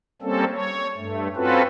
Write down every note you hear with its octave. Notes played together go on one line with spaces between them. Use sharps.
G3 A#3 C4 C#4 A4
C#5
G2 A3
C4 C#4 F4 F#4 A4 B4